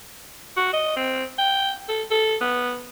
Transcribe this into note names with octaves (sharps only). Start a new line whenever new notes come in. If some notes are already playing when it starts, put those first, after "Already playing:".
F#4
D#5
C4
G5
A4
A4
B3